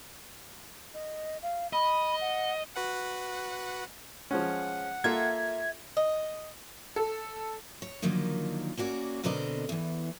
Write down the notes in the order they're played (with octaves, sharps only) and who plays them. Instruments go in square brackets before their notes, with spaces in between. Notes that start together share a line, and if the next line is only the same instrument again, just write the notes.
[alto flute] D#5
F5
[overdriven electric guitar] D#5 [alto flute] B5
[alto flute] F#5
[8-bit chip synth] F#4 B4 F#5
[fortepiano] F3 G#3 C#4 [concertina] F#5
[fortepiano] A#3 F4 A4 [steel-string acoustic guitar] E5 [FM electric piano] G#6
[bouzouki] D#5
[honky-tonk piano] A4
[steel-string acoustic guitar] C#5
D3 D#3 F3 F#3 A#3 D#4
A#3 C#4 F#4 D5
B2 D3 C4 A#4 D5 D#5
E2 E3